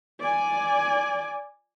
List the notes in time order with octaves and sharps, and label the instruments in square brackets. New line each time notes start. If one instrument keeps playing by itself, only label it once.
[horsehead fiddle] D5 G#5